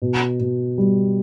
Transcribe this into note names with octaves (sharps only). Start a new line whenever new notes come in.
B2
B2
G3